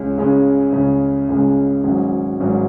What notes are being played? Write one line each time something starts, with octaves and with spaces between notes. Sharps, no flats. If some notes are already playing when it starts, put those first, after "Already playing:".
Already playing: C#2 C#3 G#3 C#4
C#2 C#3 G#3 C#4
C#2 C#3 G#3 C#4
C#2 C#3 G#3 C#4
G#1 G#2 F#3 C#4
G#1 G#2 F#3 C#4